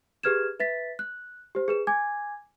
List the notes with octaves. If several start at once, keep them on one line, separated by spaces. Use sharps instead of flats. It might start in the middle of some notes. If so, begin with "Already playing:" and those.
G4 G#4 B4 F6 G#6 E7
B4 E5 A6 B6
F#6
G4 C5
G#4 B4 E7
G#5 D6 G#6